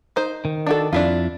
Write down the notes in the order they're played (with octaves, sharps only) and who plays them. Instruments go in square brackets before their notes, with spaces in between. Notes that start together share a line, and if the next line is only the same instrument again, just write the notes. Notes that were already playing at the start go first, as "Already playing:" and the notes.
[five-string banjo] D#4 C5
[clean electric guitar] D#3
[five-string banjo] D4 F#4 A4
[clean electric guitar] F2 [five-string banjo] D4 E4 F4